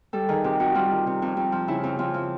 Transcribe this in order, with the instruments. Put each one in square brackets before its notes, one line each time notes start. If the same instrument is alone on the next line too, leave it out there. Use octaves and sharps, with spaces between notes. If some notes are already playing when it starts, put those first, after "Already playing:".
[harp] G3 A4
D#3 G#4
C3 G4
F2 F#4
G3 F4
D#3
C3
F2
F2
F3
C#3 E4
F2
F2 F4
F3